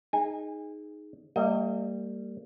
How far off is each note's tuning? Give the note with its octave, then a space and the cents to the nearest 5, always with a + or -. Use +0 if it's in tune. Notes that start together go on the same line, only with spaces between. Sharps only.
D#4 +0 G#4 +5 G#5 -30
G3 +0 A#3 -35 D#5 +30